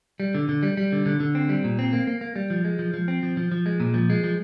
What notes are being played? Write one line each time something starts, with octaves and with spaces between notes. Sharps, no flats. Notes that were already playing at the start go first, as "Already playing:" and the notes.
G3
D3
D3
G3
G3
D3
D3
D3
C4
G3
A#2
C4
A#3
A#3
A#3
G3
F3
G#3
F3
F3
C4
F3
F3
F3
G#3
A#2
F3
G#3
F3